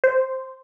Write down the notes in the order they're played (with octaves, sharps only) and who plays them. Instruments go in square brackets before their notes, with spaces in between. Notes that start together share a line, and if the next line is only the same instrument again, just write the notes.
[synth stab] C5